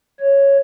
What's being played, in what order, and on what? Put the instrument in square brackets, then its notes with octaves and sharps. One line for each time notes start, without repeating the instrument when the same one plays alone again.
[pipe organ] C#5